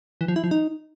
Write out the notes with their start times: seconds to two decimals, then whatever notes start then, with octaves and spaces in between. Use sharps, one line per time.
0.21 E3
0.28 F3
0.36 E4
0.44 F3
0.51 D#4